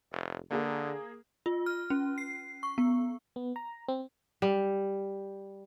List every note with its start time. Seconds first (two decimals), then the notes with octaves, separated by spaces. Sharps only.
0.12 F1
0.51 D3 A#3 G#4
1.46 F4
1.66 F6
1.90 C#4
2.18 C7
2.63 C#6
2.78 B3
3.36 B3
3.56 A#5
3.88 C4
4.42 G3